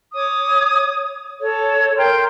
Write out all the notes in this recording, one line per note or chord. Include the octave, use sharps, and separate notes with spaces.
C#5 D6 D#6
A4 C#5
A#4 G5 C6 G6